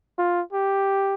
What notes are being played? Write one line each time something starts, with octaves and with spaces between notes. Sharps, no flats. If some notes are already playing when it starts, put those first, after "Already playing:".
F4
G4